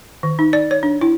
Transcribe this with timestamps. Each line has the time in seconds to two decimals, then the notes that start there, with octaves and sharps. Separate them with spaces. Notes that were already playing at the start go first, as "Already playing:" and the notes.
0.23 D#3
0.39 D#4
0.53 D5
0.71 C#5
0.83 D4
1.01 E4